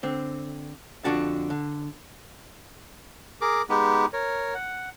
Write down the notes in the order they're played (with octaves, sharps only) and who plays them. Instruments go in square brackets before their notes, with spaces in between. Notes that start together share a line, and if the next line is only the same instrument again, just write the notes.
[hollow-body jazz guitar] D3 C4
F2 D3 E3 D4 F#4 A5
D3
[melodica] G#4 A#4 D6
G#3 B3 D#4 G4
A#4 C#5
F#5